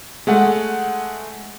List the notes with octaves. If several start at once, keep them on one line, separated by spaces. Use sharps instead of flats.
G#3 A3 F#5